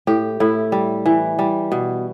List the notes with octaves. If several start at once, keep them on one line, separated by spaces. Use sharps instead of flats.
A2 G4
A2 E4
G3
E3
G3
B2